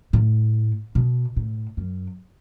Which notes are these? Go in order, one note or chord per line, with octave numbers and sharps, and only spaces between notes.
A2
B2
A2
F#2